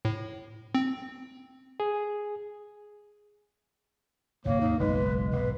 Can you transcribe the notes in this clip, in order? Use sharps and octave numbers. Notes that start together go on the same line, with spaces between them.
A2
C4
G#4
D1 G1 C3 A#3 C#5
D#2 G#2 D#4
F#1 B1 G#3 B4
B1 G#2 B4